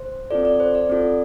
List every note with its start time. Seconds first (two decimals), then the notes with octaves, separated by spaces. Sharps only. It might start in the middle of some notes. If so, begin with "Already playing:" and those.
Already playing: C5
0.31 C4 F4 A4 D5
0.45 D5
0.60 C5
0.75 D5
0.89 C4 F4 A4